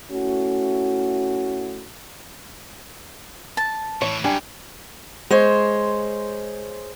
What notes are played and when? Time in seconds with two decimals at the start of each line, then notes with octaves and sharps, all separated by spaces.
0.12 A3 C#4 E4 F#4
3.57 A5
4.02 A2 E3 C#5
4.24 F#2 G3 D4 G#5
5.31 G#3 C5 C#5